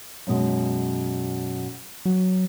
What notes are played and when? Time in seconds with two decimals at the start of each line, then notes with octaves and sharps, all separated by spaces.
0.27 F#2 B2 G#3
2.05 F#3